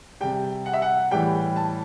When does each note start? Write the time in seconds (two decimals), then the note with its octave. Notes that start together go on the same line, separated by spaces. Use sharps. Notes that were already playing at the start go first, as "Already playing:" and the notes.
0.20 C3 G3 G5
0.66 F#5
0.73 E5
0.82 F#5
1.11 A2 E3 G3 G5
1.56 A5